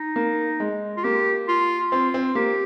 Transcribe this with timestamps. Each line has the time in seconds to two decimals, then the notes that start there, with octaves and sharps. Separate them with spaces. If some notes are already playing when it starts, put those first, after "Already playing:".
Already playing: D#4
0.16 A#3
0.60 G#3
0.97 F4
1.03 A#3 G4
1.48 F4
1.92 C4 F4
2.14 C4
2.35 A#3 G4